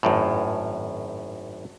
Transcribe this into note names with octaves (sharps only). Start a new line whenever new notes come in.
G#1 F#2 A2